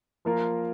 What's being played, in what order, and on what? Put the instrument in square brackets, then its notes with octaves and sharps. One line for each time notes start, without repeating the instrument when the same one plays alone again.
[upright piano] F3 A#3 F4 A#4